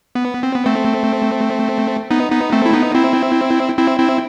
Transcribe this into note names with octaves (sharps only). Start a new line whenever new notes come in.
B3
C4
B3
A3 C4
B3 D#4
B3 D#4
A3 C4
E4
B3 D#4
C4 E4
C4 E4
C4 E4